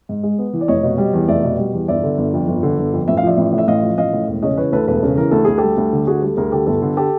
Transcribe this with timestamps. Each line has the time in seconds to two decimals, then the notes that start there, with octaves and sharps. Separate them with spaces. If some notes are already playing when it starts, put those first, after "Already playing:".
0.09 G#2
0.23 G#3
0.39 B3
0.53 E3
0.61 D5
0.68 F1 C#5 D#5
0.83 B2
0.98 G3
1.14 E2
1.28 F1 D5 E5
1.44 B2
1.58 G3
1.74 E2
1.88 G1 D5 E5
2.04 D3
2.18 G1
2.33 F2
2.48 G1
2.63 D3
2.78 G1
2.93 F2
3.08 A1 E5
3.17 F5
3.23 F3 D5 E5
3.37 A1
3.53 A2
3.58 E5
3.68 A1 D#5 F5
3.83 F3
3.98 A1 D#5 F5
4.13 A2
4.28 E1
4.42 C#3 C#5 D#5
4.57 E3 B4 C#5
4.72 D2 A4 B4
4.88 E1 A4 B4
5.03 C#3
5.17 E3 A#4
5.31 D2 A4
5.44 D2 G#4
5.58 G3 G4 A4
5.77 D2
5.93 D3
6.07 D2 F#4 G#4
6.22 G3 G4 A4
6.37 D2 G#4 A#4
6.52 D3 G4 A4
6.67 G1 G4 A4
6.82 D3
6.97 G4 A4